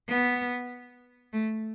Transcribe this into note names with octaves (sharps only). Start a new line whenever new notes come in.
B3
A3